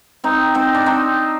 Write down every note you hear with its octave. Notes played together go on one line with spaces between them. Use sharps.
C4 D#4
C4 D#4
D4
C4 D#4